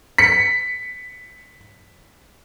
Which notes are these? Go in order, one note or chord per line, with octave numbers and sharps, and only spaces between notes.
B6 C#7